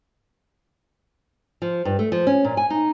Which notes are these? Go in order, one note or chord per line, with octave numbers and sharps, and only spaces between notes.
F3
G2
A3
F3
C#4
A#2
G#5
D#4